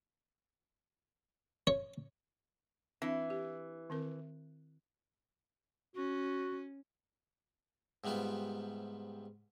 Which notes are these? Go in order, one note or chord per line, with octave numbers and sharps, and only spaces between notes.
C#5
E3 C4 D4
G4
D#3 C4 A#4
C#4 F#4
G#2 C3 G3 B3 F4